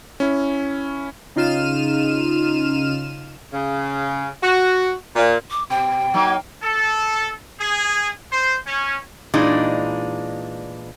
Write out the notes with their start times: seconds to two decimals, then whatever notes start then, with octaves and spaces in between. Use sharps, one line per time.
0.20 C#4 E4
1.36 C#3 D#4 F4 F6 D#7 E7
3.53 C#3
4.41 F#4
5.16 A#2
5.50 D6
5.70 B2 G5
6.14 F#3 A#3 D#4
6.63 A4
7.60 G#4
8.32 C5
8.66 C#4
9.34 A#2 E3 G#3 D4 D#4